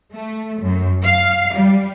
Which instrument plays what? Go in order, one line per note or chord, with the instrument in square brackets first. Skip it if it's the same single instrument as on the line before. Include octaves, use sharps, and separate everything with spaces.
[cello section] A3
F#2
F5
G3